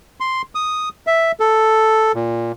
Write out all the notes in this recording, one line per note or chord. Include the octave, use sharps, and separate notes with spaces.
C6
D#6
E5
A4
A#2